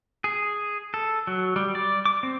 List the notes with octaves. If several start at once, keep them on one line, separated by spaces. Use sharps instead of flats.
G#4
A4
F#3
G3
D5
D6
C4